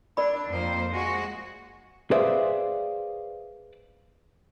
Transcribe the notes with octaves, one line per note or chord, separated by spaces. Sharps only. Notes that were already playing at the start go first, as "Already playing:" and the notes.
D4 A#4 D5 B5
F2 A#3 C5
G#3 F#4
G#4 B4 C5 D5 E5 F5